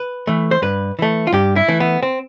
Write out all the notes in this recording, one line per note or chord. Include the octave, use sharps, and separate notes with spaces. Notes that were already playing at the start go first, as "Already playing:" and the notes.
Already playing: B4
E3 A3
C5
G2 B4
E3 A3
F4
G2 G4
E4
E3 A3
B3
C4